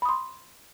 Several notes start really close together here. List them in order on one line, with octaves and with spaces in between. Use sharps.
B5 D#6 C6